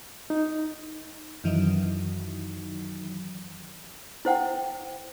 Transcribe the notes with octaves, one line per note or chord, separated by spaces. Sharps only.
D#4
F#2 D#3 E3 F#3 D#4
E4 C5 F#5 G5